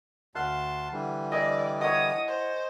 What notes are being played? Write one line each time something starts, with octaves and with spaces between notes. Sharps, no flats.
D2 F5 F#5 A5 C6 F#6
D3 E3 G3
D5 D#5 G5 G#5 E6
E4 C#5 D#5 F#5 D#6
C5